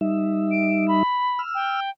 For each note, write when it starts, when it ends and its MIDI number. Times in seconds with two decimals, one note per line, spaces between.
0.01 1.03 55
0.01 1.03 63
0.01 1.03 76
0.51 0.87 98
0.88 1.41 83
1.39 1.80 88
1.39 1.80 89
1.55 1.90 79